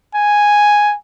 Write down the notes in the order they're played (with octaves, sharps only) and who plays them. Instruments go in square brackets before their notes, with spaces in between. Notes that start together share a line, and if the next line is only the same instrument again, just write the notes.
[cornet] G#5